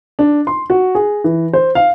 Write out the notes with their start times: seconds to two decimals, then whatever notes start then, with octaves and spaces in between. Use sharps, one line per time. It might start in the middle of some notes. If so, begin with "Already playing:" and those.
0.19 D4
0.47 C6
0.70 F#4
0.95 G#4
1.24 E3
1.53 C5
1.75 F5